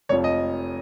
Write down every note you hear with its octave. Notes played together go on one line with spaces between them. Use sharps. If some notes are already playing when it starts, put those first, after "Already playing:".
F1 F2 F3 C#5
D#5